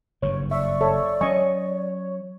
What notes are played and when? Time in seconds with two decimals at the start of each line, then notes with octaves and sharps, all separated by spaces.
0.22 F#1 G2 C#5
0.51 D5 E5 C#6
0.81 A4 C#5 E5
1.21 F#3 C#4 C#5 D#5 G#5 C#6